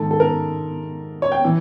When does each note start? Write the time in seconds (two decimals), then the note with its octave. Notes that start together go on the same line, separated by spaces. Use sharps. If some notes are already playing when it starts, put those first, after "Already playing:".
Already playing: G#2 D#3 A4
0.11 A4
0.20 A#4
1.22 C#5
1.32 G5
1.45 E3